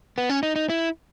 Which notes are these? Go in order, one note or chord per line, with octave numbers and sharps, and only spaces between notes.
B3
C#4
D#4
D#4
E4